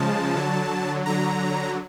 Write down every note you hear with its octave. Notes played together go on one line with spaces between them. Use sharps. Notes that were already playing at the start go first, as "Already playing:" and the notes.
Already playing: C#3 F3 G#3 A5
D3 F#3
D3 F#3 A#5